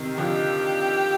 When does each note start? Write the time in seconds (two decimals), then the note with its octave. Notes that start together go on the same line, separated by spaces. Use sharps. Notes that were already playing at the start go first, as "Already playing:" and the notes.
Already playing: C3 D#3
0.17 D3 F3 G4